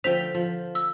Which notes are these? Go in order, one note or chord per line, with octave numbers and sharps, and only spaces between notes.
D3 F3 C5 G5 B6 F7
F3
E6